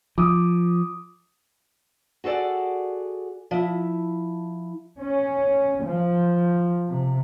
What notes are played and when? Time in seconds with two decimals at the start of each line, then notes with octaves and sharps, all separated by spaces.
0.18 F3 D6 D#6
2.24 F#4 G#4 A4 D5 F#5
3.51 F3 E4
4.99 C#4
5.85 F3
6.88 C3